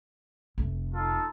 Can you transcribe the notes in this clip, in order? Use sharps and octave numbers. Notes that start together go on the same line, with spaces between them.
F1 A3
D#4 F4 A4